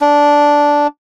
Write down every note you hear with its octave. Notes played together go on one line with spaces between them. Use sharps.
D4